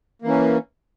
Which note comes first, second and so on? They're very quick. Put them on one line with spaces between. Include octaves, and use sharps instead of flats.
A#3 E3 C#4